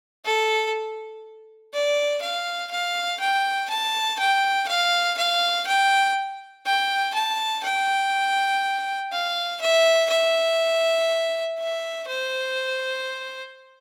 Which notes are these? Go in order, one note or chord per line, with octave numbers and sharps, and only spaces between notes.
A4
D5
F5
F5
G5
A5
G5
F5
F5
G5
G5
A5
G5
F5
E5
E5
E5
C5